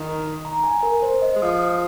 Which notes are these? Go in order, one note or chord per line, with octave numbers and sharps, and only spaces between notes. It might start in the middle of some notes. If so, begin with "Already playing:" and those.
Already playing: D#3
A#5
G#5
A#4
C5
D#5
G#3
F3 D#6
D#6